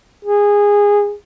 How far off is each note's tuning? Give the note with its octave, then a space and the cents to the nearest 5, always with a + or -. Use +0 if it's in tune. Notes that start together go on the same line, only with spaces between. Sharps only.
G#4 -20